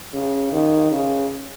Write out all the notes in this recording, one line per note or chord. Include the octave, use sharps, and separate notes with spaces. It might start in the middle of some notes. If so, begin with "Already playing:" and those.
C#3
D#3
C#3